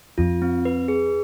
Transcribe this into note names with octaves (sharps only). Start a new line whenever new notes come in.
F2 F4
C4
B4
G#4